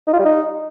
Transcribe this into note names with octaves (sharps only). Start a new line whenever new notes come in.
D#4
F4
G3
D#4